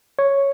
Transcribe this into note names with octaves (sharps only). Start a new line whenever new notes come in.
C#5